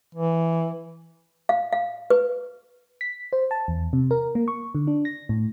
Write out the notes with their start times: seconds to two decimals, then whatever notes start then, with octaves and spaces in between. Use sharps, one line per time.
0.15 E3
1.49 F5
1.73 F5
2.10 B4
3.01 B6
3.33 C5
3.51 A5
3.68 E2
3.93 C3
4.11 A#4
4.35 A#3
4.48 C#6
4.75 D3
4.87 D4
5.05 A#6
5.29 A2